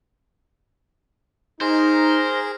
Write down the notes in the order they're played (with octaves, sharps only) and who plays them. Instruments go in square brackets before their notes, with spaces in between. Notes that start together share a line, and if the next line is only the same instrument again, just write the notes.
[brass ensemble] D#4 [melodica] G#4 [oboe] A#4 [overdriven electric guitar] C5